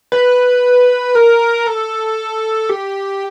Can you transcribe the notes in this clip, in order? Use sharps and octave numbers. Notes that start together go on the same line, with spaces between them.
B4
A#4
A4
G4